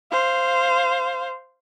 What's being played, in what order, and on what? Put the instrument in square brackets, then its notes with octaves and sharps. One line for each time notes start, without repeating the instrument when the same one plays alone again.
[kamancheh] C5 F5